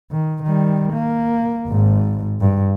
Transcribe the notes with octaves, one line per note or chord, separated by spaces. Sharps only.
D#3
D#3 G3
A#3
G#1 G#2
G2